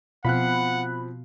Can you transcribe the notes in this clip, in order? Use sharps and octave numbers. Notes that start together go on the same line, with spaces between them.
B2 F3 C4 F5 F#5 B5 F#6